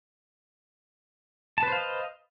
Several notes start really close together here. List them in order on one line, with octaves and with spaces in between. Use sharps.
A5 B4 C5 F5 D#5